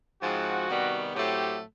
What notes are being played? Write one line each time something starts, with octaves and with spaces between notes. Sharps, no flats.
G#2 F3 G#3 C4 F#4
C3 D#3 G3 B3
A2 F#3 A3 C4 G4